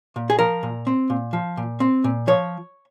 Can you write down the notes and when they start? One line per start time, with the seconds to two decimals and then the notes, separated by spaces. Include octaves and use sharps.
0.16 A#2
0.30 G#4
0.39 F3 A#4
0.63 A#2
0.87 C4
1.10 A#2
1.33 F3
1.57 A#2
1.80 C4
2.04 A#2
2.27 F3 C#5